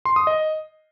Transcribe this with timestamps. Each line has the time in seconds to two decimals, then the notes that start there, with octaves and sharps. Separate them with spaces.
0.05 C6
0.16 D#6
0.27 D#5